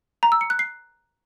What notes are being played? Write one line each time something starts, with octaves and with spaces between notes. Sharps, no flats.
A#5
E6
C#7
F#6
C7